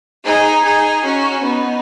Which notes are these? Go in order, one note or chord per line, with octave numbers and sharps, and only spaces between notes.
D#4 G#4
D#4 G#4
C#4 F#4
B3 D#4